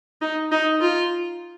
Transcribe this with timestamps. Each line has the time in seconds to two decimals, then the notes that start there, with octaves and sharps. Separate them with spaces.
0.21 D#4
0.51 D#4
0.81 F4